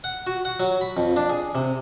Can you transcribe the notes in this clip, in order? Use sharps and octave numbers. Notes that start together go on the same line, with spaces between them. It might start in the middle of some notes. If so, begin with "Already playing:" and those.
F#5
F#4
F#5
F#3
B5
F2
D4
G#4
C3